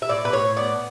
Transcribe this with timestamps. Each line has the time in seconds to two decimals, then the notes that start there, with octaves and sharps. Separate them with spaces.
0.02 E5
0.09 A2 D5
0.25 B4
0.33 A2 C#5
0.56 B3 D5